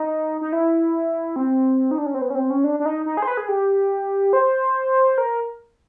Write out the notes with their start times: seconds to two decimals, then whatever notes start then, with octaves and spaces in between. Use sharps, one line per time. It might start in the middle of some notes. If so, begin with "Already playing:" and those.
Already playing: D#4
0.41 D#4
0.53 E4
1.36 C4
1.91 D#4
1.98 D4
2.06 C#4
2.14 C4
2.22 B3
2.30 C#4
2.35 C4
2.50 C#4
2.64 D4
2.80 D4
2.86 D#4
3.06 D#4
3.17 G#4
3.22 C5
3.27 B4
3.37 G#4
3.49 G4
4.33 C5
5.18 A#4